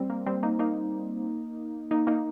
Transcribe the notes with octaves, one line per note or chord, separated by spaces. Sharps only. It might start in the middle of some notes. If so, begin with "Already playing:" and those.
Already playing: G3 C4
A#3
G3 C4
A#3 D#4
A#3 D#4
A#3 D#4
A#3 D#4